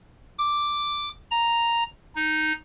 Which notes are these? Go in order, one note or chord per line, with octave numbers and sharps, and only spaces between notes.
D6
A#5
D#4